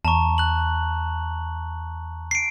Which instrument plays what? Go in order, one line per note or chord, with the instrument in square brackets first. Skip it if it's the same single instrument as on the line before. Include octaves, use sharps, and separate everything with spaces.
[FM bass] E2 [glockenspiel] A5 A#5 C#6
[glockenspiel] F#6 F#7
C7 D7